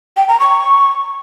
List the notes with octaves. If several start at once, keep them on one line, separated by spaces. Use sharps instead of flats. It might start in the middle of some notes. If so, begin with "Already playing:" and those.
G5
A#5
C#6